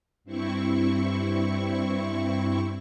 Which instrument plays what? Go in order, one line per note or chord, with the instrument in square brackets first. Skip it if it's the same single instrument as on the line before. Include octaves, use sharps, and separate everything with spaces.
[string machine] G2 C4 E4 C#6